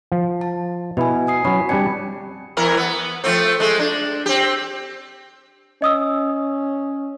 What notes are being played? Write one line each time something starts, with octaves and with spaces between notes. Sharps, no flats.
F3
A5
B2 E4 B4 G#5
G#5 D#6 C7
F#3 C#4 B5
G3 C4 D4 D5 G#5 C#7
E2 E4 A#4
B3
F3 A3 C4
G#3 A3
D4
C4 G4
C#4 D#5 D#6 E6